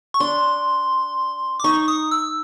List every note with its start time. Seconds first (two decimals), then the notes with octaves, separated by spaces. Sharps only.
0.14 C#6
0.20 D4 C6
1.60 D6
1.64 D#4 C#6
1.88 D#6
2.11 E6